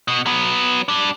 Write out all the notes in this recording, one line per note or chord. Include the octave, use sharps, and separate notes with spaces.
B2
F#3 B3
G3 D4